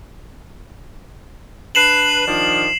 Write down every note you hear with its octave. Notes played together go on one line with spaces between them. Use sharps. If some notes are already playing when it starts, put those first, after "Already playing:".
D4 B4 C7 E7 F#7
D#3 F3 D4